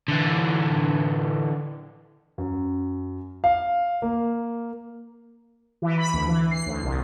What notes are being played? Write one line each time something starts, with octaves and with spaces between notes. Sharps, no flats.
D3 E3
F#2
F5
A#3
E3
B5
D2
E3
C7
D2
C2